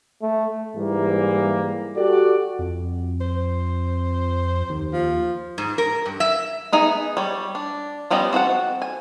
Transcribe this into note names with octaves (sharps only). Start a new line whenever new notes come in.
A3
G#2 E3 G3 A#3
F#4 G4 A4 D5
F2
C5
D#2
F3
G#2
A#4
G2
E5
B3 D#4 G#4 E5 G#5
G3 C#5
D4
F3 G3 B3 C#4 D#5
C4 F#4 A4 F#5
G#5